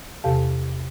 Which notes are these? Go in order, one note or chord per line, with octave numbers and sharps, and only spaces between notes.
E2 C3 G4 A4 F5 A5